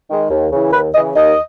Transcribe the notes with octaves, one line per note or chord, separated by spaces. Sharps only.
D#3 G#3
D#2
C#3 E3
D#2 B4
C#3 E3 D#5
D#2 D#5